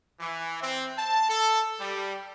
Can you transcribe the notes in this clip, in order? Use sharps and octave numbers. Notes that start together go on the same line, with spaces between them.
E3
C4
A5
A4
G3